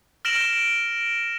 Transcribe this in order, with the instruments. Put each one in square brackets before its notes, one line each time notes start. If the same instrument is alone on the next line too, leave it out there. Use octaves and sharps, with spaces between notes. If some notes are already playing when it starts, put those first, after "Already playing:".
[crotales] F6 A#6 D7 E7 F#7